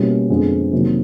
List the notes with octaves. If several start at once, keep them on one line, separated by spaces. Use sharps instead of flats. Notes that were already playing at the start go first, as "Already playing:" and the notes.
Already playing: B2 G3 A#3 C#4 E4
F2 D3 F3 G#3 B3
C3 D#3 F#3 A#3